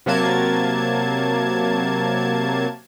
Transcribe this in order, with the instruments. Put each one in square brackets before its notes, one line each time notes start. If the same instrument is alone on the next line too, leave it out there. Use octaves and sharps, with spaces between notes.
[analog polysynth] C3 F#3 A#3 A5 G#6